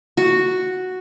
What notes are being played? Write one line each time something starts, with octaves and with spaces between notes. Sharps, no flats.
F#4